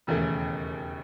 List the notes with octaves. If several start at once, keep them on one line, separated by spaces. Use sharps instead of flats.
E1 D#2 C#3 E3 A3